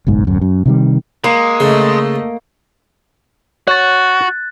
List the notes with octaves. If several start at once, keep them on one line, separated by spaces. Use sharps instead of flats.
F#1 B1 G#2
D1 F#2
F#2
C3 D#3 G3
G#3 A#3
C#3 A3 D#5
F#4 C#5 F#6 A6